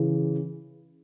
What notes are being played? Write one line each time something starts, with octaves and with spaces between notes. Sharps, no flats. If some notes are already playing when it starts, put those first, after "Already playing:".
Already playing: C#3 E3